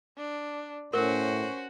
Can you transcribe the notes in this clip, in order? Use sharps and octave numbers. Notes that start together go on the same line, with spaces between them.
D4
A2 C#4 F#4 A#4 C5